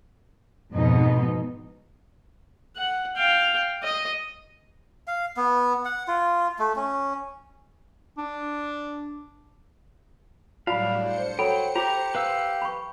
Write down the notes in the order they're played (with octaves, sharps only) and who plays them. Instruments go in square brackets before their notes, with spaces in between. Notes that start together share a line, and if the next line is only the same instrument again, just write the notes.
[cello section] F2 G#2 B2 D#4
[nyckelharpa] F#5
F5 G5
D#5
[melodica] F5
B3
F#5
F4
A3
C#4
[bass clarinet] D4
[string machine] A2 F#3 G3 [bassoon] D4 [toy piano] F4 B5 [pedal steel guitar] F5
[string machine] C5 C#7
[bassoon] F#3 [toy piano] A4 B5 [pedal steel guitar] G5
[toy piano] F4 D6 [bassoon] G4 [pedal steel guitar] A#5
[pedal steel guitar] B4 F5 E6
[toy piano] B5 C#6